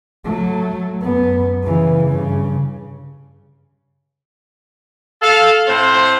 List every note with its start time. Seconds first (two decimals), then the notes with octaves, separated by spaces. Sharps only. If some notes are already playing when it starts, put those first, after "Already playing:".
0.24 F#3 A3
1.01 F#2 B3
1.63 C#3 E3
2.05 G2 C#3
5.22 A4 F5
5.67 A2 C4 C5